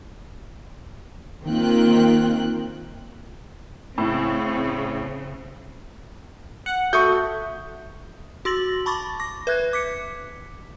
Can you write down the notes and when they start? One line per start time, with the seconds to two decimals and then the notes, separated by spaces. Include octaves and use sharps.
1.45 D#3 A#3 C4 F4 G5 F#6
3.98 A2 C#3 C4
6.66 F#5
6.93 A3 F#4 C#6 D#6 G6
8.45 F#4 C6 E6 A6 A#6 F#7
8.86 A5 B5 C#6 D6 A6
9.20 D6 A#6
9.47 B4 E5 F#6 G#6
9.73 D6 B6 C#7